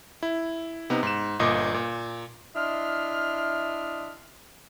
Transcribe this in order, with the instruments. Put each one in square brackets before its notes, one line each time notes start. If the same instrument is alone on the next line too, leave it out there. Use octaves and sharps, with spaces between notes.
[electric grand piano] E4
C3 B3 D#4
G#2 E7
G1 A#2 D#5 D6
A#2
[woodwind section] D4 E4 D#5 E5 C6 F6